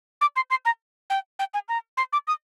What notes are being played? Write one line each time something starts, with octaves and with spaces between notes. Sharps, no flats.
D6
C6
C6
A#5
G5
G5
G#5
A#5
C6
D6
D#6